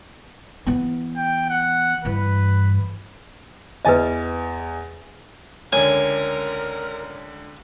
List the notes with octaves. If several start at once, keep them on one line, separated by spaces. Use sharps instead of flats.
E3 B3
G5
F#5
G2 E3 B4
E2 B4 D#5 G#5 A6
C#2 D3 A#4 C#5 G#5